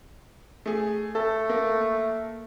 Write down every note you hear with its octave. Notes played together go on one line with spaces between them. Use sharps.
A3 G#4
A3 A4
A#3